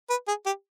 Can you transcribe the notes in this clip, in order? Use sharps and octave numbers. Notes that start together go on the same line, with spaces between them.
B4
G#4
G4